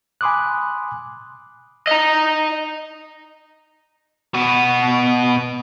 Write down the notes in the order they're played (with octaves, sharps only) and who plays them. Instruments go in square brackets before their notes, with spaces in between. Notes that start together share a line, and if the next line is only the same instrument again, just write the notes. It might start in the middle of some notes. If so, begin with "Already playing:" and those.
[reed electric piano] G#5 B5 C6 D6 D#6 F#6
[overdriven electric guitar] D#5 A#5
B2 B3